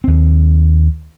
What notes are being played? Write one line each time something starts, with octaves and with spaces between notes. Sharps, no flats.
D#2 C4